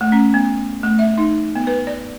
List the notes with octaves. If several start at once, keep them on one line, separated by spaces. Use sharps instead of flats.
A3
C#4
B3
A3
E5
D#4
B3
B4
D5